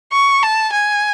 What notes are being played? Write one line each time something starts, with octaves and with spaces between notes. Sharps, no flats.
C#6
A5
G#5